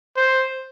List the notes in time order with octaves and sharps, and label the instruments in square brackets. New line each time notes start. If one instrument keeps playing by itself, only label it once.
[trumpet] C5